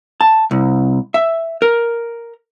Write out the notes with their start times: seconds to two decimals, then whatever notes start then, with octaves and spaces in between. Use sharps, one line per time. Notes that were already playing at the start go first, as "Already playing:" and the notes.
0.21 A5
0.51 C2
1.14 E5
1.62 A#4